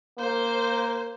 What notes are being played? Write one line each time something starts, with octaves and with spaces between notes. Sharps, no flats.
A#3 C5